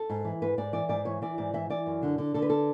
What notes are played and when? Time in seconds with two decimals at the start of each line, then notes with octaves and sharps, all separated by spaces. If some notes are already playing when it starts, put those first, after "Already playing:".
Already playing: A4
0.10 G#2
0.25 E3
0.42 G#2 B4
0.58 G#2 D5
0.73 E3 D5
0.89 G#2 D5
1.05 E3 C#5
1.22 E3 D5
1.38 G#2 D5
1.53 E3 E5
1.70 E3 D5
1.86 F#2
2.02 D3
2.18 D3
2.34 D3 A4
2.42 B4
2.50 A4